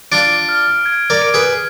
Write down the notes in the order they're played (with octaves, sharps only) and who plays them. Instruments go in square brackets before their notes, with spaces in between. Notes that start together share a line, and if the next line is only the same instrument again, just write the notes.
[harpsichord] D4 F4 [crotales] D7
[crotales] F6
G#6
[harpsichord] A#4 D5
[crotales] D7
[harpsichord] G#4 B4